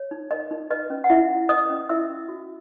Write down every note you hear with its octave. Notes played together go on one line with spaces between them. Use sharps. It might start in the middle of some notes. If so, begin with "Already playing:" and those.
Already playing: C#5
D#4
A#4 D#5
D#4
B4 D#5
C#4
F#5
E4 E5
C#4
B4 D#5 D#6
C#4
E4 E5 E6
C#4
F#4